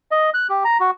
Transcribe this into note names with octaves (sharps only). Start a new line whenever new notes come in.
D#5
F#6
G4
A#5
F#4